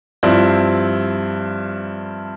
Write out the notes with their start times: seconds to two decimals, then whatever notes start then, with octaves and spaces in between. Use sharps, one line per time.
0.23 G2 F3 C4 E4